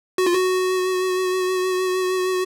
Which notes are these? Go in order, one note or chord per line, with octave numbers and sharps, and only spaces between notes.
F#4
F4
F#4